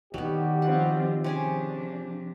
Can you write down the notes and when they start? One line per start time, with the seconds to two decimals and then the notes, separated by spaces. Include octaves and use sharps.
0.14 B2 D3 D#3 F#3 G3 B3 G4
0.62 F3 C4 F4 F#5
1.24 C3 F3 C#4 D4 G#4